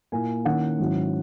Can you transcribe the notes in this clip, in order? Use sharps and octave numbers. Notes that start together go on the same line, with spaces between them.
A#2 A#3 E4 G#5
D#3 A#3 C#4 E4 F#5
G#2 D#3 F#3 C#4 E4